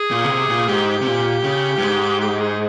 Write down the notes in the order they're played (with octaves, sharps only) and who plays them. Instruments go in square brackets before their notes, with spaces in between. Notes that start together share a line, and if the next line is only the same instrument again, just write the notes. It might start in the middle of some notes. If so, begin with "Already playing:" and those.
Already playing: [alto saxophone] G#4
[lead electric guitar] A#2
C#3
C3
A#2
[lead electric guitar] G#2 [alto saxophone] G4
[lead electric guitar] C3
A#2
C#3
G2
G#2
[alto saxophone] G4
G#4